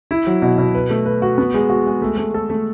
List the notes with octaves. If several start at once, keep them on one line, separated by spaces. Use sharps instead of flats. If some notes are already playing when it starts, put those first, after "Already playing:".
E4
F#3
B2
B2
B4
A3
B4
F#4
B3
G#3
F#4
G#3
A3
A3
A4
A3